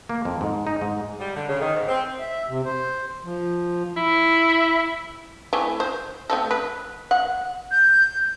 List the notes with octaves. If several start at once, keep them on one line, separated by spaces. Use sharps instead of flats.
A#3
F2
G#2
D#4
G#2
G3
D3
C#3
D#3
G#2
C4
E5
C3
C5
F3
E4
E3 A3 C4
C5
A3 C4 A4
B4
F#5
G6